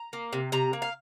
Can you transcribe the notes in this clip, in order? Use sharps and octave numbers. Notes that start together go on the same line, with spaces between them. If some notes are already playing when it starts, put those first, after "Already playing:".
Already playing: A#5
A#3
C3
C3 A#5
A#3
F5